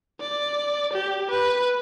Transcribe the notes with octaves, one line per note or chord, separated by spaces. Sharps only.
D5
G4
B4